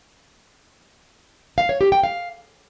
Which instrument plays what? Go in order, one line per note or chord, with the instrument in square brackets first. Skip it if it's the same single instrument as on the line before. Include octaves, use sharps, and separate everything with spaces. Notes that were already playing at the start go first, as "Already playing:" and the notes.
[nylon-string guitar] F5
C#5
G4
G5
F5